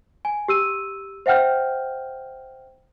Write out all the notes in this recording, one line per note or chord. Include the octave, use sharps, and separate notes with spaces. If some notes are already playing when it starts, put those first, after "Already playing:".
G#5
G4 E6 D#7
C5 E5 F#5 G5 F6 G6